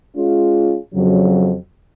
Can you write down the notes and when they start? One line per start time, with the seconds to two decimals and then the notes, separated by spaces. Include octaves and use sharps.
0.16 G#3 C#4 F4
0.92 F2 C#3 F#3